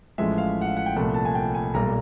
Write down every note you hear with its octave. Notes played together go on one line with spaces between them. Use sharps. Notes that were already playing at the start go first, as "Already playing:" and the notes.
A1 A2 F3 G#3 E5
F5
F#5
F5
F#5
G5
C2 A#2 F3 A3 F#5
A5
G#5
G5
G#5
B1 A#2 G3 A#5